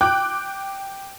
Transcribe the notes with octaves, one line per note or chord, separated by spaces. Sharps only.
G5 D6 F#6